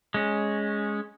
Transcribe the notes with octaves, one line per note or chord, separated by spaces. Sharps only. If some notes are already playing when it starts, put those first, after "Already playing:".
G#3 C#4